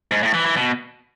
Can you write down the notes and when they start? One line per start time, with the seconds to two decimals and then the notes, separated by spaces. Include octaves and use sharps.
0.11 G#2
0.23 A2
0.34 E3
0.45 E3
0.57 B2